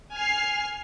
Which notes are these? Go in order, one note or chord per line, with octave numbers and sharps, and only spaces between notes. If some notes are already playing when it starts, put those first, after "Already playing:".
G#5 F6 C7